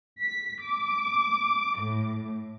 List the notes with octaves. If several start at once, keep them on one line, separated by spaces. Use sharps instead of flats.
B6
D6
A2